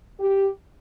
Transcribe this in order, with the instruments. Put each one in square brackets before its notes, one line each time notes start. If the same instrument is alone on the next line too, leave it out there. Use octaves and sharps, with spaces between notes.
[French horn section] G4